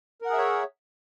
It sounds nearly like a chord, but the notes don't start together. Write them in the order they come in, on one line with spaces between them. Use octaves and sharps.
A#4 F#5 G#4 E5 C#5